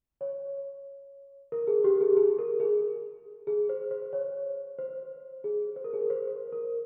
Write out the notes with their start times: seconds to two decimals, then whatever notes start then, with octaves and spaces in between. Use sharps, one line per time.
0.21 C#5
1.52 A#4
1.67 G#4
1.84 G4
2.01 G#4
2.17 G#4
2.39 A#4
2.60 G#4
3.47 G#4
3.69 C5
3.91 C5
4.13 C#5
4.78 C5
5.44 G#4
5.76 C5
5.84 A#4
5.93 G#4
6.01 A#4
6.10 C5
6.52 A#4